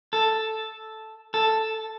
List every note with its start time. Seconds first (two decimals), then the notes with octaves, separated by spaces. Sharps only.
0.13 A4
1.34 A4